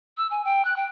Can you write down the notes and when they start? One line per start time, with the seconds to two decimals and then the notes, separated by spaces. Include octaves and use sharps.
0.17 E6
0.31 G#5
0.45 G5
0.65 F#6
0.77 G5